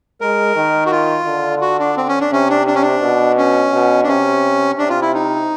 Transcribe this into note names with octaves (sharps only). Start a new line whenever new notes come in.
G#3 A#4
D#3
F#4
F4
D3
F#4
D4
C4
C#4
D4
C3 C#4
D4
D4
C#4
D4
B2
C#4
B2
D4
C3 C#4
C3 D4
F4
E4
D#4